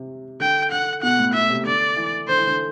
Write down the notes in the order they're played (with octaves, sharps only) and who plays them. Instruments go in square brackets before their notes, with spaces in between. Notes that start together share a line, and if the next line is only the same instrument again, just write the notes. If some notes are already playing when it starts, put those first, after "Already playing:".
Already playing: [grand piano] C3
[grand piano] D3 [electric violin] G5
[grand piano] D3 [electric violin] F#5
[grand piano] B2 [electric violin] F#5
[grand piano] A2
[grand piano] B2 [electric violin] E5
[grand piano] C3
[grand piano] D3 [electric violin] D5
[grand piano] E3
[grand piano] D3 [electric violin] C5
[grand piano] E3
D3